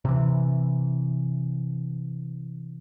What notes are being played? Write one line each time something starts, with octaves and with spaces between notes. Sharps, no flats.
C3 E3